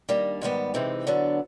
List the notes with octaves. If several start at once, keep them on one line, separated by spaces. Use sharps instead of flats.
D#3 G3 A#3 D4
G#2 D#3 G3 B3
C3 E3 G#3 C4 D#4
D3 F#3 B3 D4